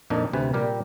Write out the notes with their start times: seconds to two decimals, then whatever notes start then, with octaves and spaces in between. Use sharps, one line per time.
0.10 F2 A#2 F3 D4 D#4
0.33 D2 C3 B4 G#5
0.53 A#2 G3 G4 A#4